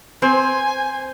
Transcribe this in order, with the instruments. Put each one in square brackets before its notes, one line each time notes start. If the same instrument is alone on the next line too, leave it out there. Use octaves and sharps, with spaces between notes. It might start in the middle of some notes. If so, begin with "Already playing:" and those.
[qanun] C4 [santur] C5 [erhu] G#5